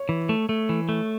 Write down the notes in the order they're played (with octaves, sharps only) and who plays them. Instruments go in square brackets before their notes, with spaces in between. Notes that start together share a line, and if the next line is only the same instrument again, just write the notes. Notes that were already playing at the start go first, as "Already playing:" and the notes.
Already playing: [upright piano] C#5
[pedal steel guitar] E3
A3
A3
E3
A3